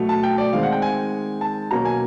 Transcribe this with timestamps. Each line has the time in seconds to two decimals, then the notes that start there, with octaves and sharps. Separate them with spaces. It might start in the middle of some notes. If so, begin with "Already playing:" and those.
Already playing: B2 F#3 A3
0.09 A5
0.23 G5
0.38 D5
0.53 D#3 G#3 C4 F5
0.63 F#5
0.72 G5
0.82 G#5
1.41 A5
1.71 B2 F#3 A#3 C#4 A#5
1.85 G#5